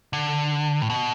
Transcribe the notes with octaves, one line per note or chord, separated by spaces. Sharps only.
D3
A2
B2